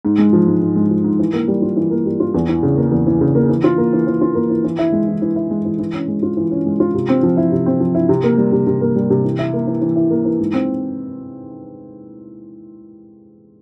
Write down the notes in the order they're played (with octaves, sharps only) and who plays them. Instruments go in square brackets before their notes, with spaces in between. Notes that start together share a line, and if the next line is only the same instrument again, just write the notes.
[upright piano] G#2
G#3
F3
G#2
G#2
G#3
F3
G#2
E3
A#3
G3
F4
E3
A#3
G3
F4
E2
E3
C#3
A#3
E2
E3
C#3
A#3
E3
F4
A#3
E3
E3
F4
A#3
E3
E3
E4
G#3
E3
E3
E4
G#3
E3
E3
C#4
G#3
F4
E3
C#4
G#3
F4
C3
C4
F3
E4
C3
C4
F3
E4
C3
A#3
G3
C3
C3
A#3
G3
C3
E3
E4
A#3
E3
E3
E4
A#3
E3
G#2
C4